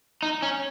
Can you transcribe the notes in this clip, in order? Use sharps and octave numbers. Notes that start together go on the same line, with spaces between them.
D#4
C#4